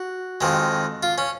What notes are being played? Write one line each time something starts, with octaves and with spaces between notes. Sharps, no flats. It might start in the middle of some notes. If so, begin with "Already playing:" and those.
Already playing: F#4
F2 D#3 G#3
F4
C#4